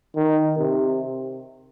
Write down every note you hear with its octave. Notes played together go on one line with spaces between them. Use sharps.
D#3
C3